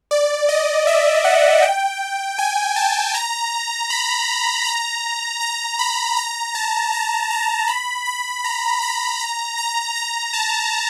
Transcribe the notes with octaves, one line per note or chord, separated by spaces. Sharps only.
D5
D#5
E5
F#5
G5
G#5
A5
A#5
B5
A#5
A#5
B5
A#5
A5
A#5
A#5
B5
B5
A#5
B5
A#5
A#5
A#5
A5